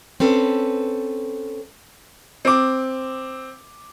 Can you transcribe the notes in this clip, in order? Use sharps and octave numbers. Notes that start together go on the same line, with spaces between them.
C4 C#4 A4 B4
C4 D6